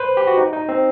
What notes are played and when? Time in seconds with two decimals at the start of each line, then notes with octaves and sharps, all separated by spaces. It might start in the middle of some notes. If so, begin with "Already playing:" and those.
Already playing: B4 C5
0.17 G4
0.27 F#4
0.37 D#4
0.53 D#4
0.69 C4